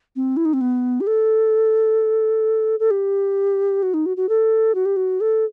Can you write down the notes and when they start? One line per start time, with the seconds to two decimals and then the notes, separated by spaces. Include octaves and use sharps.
0.16 C4
0.37 E4
0.45 D#4
0.53 C4
0.61 B3
1.01 G4
1.07 A4
2.80 A4
2.91 G4
3.82 F#4
3.94 D#4
4.06 F#4
4.17 F#4
4.29 A4
4.75 F#4
4.85 G4
4.96 F#4
5.21 A4